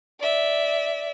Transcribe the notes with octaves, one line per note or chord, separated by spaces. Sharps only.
D5 E5